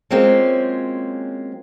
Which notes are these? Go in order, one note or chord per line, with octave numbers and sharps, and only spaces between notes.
F#3 G#3 A#3 C4 C#4 F4